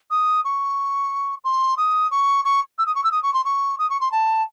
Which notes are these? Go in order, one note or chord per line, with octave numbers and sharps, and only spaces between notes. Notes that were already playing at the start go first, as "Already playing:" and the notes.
D#6
C#6
C6
D#6
C#6
C#6
E6
D#6
C#6
E6
D#6
C#6
C6
C#6
D#6
C#6
C6
A5